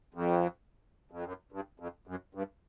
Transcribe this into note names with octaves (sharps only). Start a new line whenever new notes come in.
F2
F2
F#2
G2
F2
F#2
G2